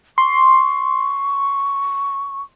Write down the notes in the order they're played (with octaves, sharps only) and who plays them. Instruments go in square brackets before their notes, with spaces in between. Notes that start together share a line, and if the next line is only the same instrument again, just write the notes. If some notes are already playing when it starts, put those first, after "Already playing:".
[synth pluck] C6 [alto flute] C#6